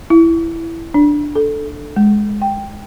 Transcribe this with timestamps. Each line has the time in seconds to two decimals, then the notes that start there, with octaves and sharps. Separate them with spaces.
0.10 E4
0.94 D4
1.35 A4
1.96 G#3
2.42 G5